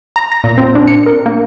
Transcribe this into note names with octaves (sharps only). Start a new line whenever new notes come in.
A#5
A#6
A#2
C4
D4
C#7
A#4
A#3